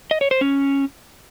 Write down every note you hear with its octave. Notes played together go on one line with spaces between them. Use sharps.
D#5
C#5
C5
C#4